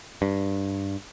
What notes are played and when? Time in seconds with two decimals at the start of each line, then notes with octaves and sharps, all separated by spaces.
0.22 G2